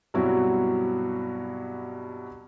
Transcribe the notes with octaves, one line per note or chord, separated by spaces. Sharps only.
G2 B2 F#3 C4 E4 F#4